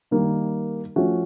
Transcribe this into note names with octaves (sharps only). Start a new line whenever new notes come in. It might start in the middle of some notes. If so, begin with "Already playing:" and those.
D#3 G3 A#3 D#4
F3 A3 C#4 F#4